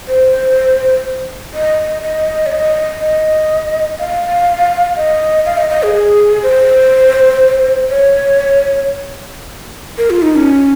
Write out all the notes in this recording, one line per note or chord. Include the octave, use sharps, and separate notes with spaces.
C5
D#5
D#5
C#5
D#5
D#5
F5
D#5
F5
D#5
D#5
G#4
G#4
C5
C#5
A#4
F4
D#4
C#4